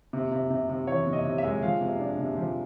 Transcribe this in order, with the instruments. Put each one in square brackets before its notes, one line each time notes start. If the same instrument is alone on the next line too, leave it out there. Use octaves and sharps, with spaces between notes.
[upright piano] C3
C3
C3
C3
E3 C#5
C3
D#5
C3
E5
G#3
F3 F5
C3
D4
C3
F3